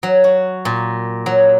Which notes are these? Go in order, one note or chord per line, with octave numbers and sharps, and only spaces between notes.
F#3
F#4
A#2
F#3